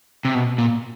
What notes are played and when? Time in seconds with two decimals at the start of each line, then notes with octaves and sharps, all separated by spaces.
0.25 C3
0.35 B2
0.58 A#2